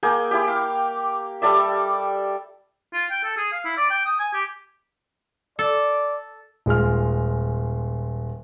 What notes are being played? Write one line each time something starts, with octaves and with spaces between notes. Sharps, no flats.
A#3 G#4 G5
E4 G4
F5
G3 A4 D5 E5
F4
G5
A4
G#4
F5
E4
D5
G5
D#6
G#5
G4
A4 D5
D#1 G#3 F4 F6